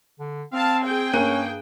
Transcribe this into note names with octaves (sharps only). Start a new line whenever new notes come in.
D3
C4 F5 A5
G#4 G5
G2 A#3 C#4 F#6 D#7